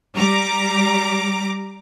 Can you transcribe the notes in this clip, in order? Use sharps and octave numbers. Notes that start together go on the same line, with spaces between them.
G3 A#5 D6